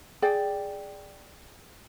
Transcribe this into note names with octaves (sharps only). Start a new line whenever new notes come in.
G#4 D5 G5